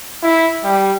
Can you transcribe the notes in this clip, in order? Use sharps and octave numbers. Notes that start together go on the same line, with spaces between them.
E4
G3